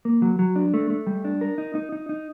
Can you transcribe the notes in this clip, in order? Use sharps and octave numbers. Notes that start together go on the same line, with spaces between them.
A#3
F#3
F#3
D4
A3
A3
G3
D4
A#4
D#4
D#4
D#4
D#4